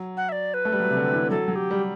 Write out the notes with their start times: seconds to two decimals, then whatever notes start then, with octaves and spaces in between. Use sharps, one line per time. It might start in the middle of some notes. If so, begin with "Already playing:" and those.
Already playing: F#3
0.17 F#5
0.29 E5
0.32 D5
0.54 B4
0.65 A3
0.72 G3
0.80 F#3
0.90 C3
0.97 D3
1.14 E3
1.30 F#3 A4
1.48 F#3
1.56 G4
1.70 G3